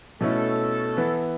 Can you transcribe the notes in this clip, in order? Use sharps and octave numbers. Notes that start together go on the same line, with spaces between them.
B2 A3 C#4 E4 A4
E3 B3 E4